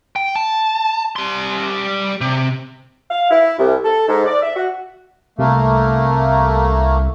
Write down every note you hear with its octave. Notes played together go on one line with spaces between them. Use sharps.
G5
A5
G3 C6
C3
F5
E4
C2
A4
G#2
D5
E5
F#4
C2 A3 A#3